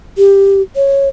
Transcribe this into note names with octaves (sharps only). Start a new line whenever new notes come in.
G4
C#5